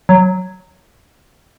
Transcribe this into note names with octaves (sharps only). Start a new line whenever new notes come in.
F#3